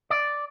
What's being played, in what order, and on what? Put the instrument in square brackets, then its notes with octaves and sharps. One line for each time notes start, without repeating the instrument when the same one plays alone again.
[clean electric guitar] D5